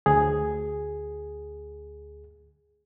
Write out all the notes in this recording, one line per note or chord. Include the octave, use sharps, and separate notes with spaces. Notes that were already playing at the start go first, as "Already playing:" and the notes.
D2 G#4